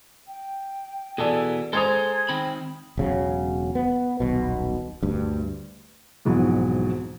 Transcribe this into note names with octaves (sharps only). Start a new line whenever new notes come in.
G5
B2 E3 B3 G#4 A4 D5
G#3 A4 C5 G5 A#5 D#6 G#6
D#3 C4 G5 B5
E1 C#3 F#3
B3
D#1 B1 B2
D2 G2
B1 F2 G#2 B2 E3